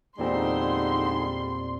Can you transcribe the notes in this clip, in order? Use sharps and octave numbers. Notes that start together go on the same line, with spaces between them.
E2 A#2 D3 G3 G#3 C4 D#4 C6